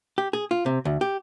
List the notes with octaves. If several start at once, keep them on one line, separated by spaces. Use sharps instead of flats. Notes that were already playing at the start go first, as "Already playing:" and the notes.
G4
G#4
F4
C3
D2
G4